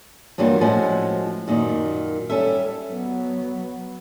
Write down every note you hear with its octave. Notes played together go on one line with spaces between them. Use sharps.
G2 E3 F#3 G3 A#3 F4
A2 F3 G#3 C#4 E4 F#4
F#2 A#2 D#3
G3 C#4 A4 E5
F#3 B3